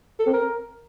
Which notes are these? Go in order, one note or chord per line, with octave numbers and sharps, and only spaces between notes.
A4
C4
A#4